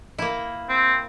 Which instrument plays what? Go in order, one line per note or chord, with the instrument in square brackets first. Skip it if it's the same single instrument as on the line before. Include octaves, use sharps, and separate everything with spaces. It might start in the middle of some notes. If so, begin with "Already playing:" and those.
[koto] A#3 E4
[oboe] C4